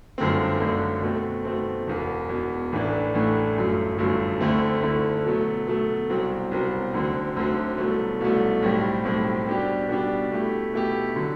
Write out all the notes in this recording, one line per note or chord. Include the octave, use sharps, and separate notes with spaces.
G1 F#2 D3 A3 C4
G1 F#2 D3 A3 C4
B2 A3 C4
B2 A3 C4
E1 E2 B2
E1 E2 B2
A1 A2 E3 A3 D4
A1 A2 E3 A3 D4
G1 F#2 F#3 A3
G1 F#2 F#3 A3
D2 D3 A3 C4 E4
D2 D3 A3 C4 E4
B2 F#3 A3
B2 F#3 A3
C2 B2 F#3 C4
C2 B2 F#3 C4
D2 D3 F#3 C4
D2 D3 F#3 C4
C2 B2 F#3 A3
C2 B2 F#3 A3
B1 A2 G3 C4
B1 A2 G3 C4
B2 G3 D4 G4
B2 G3 D4 G4
B2 A3 E4 G4
B2 A3 E4 G4
D3 F#3